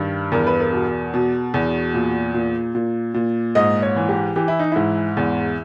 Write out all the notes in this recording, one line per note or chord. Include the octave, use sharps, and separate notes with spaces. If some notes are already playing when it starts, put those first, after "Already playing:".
Already playing: G2 D#3
E2 A#4
B4
A#4
B2
B2
E2
A#2
A#2
A#2
A#2
G#2 D#5
C#5
E3
G4
E3 G4
E4
D#4
G#2 E4
E2